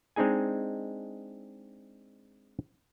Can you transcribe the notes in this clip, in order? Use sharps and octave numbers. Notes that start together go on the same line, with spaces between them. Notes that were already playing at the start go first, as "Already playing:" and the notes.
G#3 C4 D4 D#4 G#4 G#5